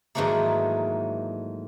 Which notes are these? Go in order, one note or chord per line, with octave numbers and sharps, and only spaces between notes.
G#2 D#3 E3 F#3 A3 A#3